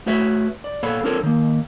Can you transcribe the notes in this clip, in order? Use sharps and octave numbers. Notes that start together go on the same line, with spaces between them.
A3 F#4 B4 C#5 E5
D5
A#2 B3 A4 C#5 F5 B5
C4 D4 F4 A4 A#4 C#5
D#3 A#3